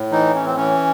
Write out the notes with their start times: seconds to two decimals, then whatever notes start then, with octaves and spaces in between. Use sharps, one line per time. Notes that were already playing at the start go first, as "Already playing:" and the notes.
Already playing: A2
0.12 E3 D#4
0.35 C#4
0.45 C4
0.56 E3 C#4